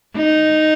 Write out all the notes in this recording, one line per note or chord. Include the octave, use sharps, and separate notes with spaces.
D#4